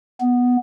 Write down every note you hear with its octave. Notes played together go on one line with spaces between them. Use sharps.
B3